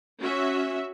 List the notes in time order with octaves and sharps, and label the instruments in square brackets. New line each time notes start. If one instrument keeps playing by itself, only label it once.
[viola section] C#4 F#4 E5